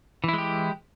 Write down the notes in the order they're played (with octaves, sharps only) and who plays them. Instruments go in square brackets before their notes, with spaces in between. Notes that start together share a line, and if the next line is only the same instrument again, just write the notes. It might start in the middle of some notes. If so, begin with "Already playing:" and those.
[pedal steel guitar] E3
E4
G#3
G4